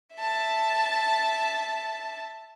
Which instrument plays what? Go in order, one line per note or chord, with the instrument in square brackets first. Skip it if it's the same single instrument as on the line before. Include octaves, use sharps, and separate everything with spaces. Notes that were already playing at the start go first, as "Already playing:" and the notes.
[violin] E5 A5